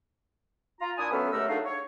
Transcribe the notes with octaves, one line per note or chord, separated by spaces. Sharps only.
F4 A#5
A#2 D4 E4 G#5 D#6
F#3 A3 B3 C#4 A4 B4
C#2 F#2 A3 G4 A#4 E6
F#3 A3 D4 D#4 G#4 F5
C#5